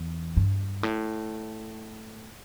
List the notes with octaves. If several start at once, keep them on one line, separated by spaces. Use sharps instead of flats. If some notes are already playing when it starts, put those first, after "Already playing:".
Already playing: E2
G2
A2